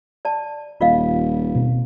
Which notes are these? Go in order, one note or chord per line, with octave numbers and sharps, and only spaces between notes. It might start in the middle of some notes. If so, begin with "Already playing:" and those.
D5 A5
D#1 F4 D#5 F5
B2 C4